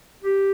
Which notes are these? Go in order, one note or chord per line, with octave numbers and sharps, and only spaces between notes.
G4